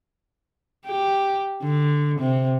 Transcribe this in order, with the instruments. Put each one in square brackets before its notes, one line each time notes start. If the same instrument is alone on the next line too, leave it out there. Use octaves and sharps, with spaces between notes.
[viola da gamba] G4
D3
C3